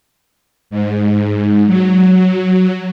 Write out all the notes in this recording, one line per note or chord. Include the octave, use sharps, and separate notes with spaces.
G#2
F#3